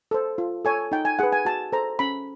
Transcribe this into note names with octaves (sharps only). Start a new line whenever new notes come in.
A4 C5
F4
A4 C#5 G#5
D#4 G5
G#5
G#4 B4 F#5
G#5
F#4 A5
A4 C5 A#5
C#4 B5